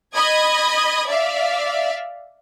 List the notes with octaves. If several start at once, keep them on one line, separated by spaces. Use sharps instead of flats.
D#5 B5 D#6 G#6
D5 E5 F5